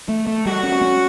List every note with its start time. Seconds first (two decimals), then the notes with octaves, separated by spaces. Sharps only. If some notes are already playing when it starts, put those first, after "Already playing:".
0.09 A3
0.27 A3
0.46 G3 F#4
0.64 C#4
0.82 C#4